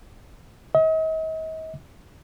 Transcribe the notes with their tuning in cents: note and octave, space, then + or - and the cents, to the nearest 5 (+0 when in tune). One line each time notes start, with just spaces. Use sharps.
D#5 +40